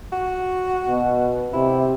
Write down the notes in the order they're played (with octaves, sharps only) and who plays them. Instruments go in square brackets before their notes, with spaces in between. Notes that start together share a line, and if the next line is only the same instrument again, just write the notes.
[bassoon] F#4
[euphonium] B2
[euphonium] C3 [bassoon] E4